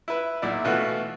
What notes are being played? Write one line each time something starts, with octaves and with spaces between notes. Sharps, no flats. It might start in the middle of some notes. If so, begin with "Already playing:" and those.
E4 B4
B1 A#2 E4 D5
B2 E3 A3 F4 F#4